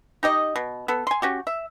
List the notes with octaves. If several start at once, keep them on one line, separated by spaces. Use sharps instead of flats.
D#4 G4 D#5
B2
B3 A4
G#5 C6
C#4 F#4 G4
E5